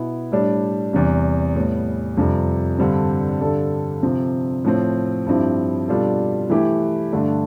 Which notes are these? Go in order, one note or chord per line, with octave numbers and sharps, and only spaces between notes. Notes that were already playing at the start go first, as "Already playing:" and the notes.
Already playing: B2 B3 E4
A2 G3 D4
E2 C3 G3
A2 G3 B3
F2 C3 G3
G2 D3 G3 C4
G2 D3 G3 D4 A4
C3 F3 C4
A2 F3 C4
G2 F3 C4 E4 G4
B2 G3 D4 F4 A4
E3 A3 E4 G4
G2 D3 A3 D4